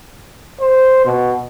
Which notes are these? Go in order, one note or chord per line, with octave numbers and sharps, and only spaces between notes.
C5
B2